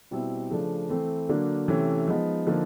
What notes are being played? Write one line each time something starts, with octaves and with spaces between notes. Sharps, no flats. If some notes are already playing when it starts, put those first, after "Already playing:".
B2 G3 C4 E4
C#3 F3 A3 D4
E3 A3 C4 E4
D3 F#3 A#3 D4
C3 E3 A3 C#4
F3 G#3 B3 D#4
D3 F3 A#3 D#4